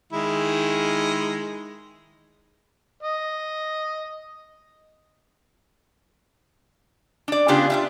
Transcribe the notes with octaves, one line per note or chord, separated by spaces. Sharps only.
D#3 G#3 E4
D#5
D4 D5
C#3 B3 D4 F4 G4
D4 F4 E5